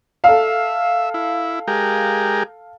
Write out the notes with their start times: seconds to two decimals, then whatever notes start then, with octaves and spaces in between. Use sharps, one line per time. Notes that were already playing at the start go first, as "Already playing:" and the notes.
0.24 A4 E5 F5
1.14 E4
1.67 G#3 G4 A#4